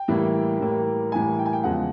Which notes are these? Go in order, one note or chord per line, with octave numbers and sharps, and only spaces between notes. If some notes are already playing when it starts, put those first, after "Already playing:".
Already playing: G5
A2 E3 G3 A#3
A2 E3 G3 A#3
A2 E3 G3 A#3 G#5
G5
G#5
G5
E2 C#3 F3 G#3 F#5